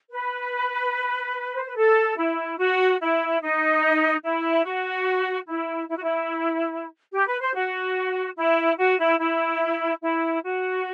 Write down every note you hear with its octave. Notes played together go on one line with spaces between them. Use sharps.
B4
C5
B4
A4
E4
F#4
E4
D#4
E4
F#4
E4
E4
F#4
E4
G4
B4
C5
F#4
E4
F#4
E4
E4
E4
F#4